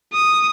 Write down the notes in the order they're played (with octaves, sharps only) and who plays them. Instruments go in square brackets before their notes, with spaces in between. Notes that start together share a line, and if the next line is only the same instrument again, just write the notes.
[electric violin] D#6